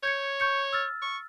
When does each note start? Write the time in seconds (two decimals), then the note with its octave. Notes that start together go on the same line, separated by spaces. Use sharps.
0.03 C#5 G6 G#6 C#7
0.40 C#6 G6 C#7
0.73 E6 F6 A6
1.02 C#6